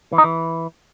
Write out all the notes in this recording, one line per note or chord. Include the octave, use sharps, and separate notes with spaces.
E3
D#4
E3